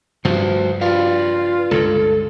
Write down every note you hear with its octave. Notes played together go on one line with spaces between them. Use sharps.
G2 C#3 F3 F#4 C5
F4 B4 D5 F5
C#2 G2 D3 A4